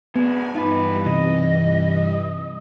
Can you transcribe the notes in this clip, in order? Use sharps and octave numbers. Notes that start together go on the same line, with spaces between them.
G#3 B3 D4 G#5
G2 E3 G3 D#4 F4 B4
C3 D#5